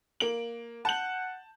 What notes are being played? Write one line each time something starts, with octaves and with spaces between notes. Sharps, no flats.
A#3 D7 F#7
F#5 A5 G6 F#7